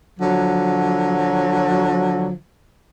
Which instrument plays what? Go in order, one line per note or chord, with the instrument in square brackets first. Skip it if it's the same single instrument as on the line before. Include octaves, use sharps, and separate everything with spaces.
[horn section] D3 F3 F#3